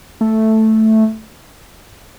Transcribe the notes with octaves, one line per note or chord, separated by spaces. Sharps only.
A3